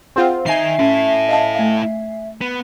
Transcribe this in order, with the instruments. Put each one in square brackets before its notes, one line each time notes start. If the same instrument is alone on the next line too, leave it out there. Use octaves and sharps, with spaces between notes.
[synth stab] C4 F4 [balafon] G#4 C5 F#5
[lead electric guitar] D#3 D#4 [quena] E5 [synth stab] G#5 C7
[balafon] C#4 [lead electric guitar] E4 A4
[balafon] D#5 F5 A5
A3 F5
[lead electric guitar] B3